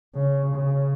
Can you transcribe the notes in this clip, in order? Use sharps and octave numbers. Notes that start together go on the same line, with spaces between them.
C#3
C#3